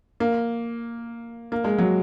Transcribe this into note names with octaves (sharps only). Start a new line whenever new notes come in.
A#3
A#3
G#3
F#3